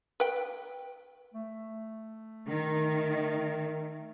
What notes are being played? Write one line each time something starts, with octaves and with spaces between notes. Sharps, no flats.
B4 G5
A3
D#3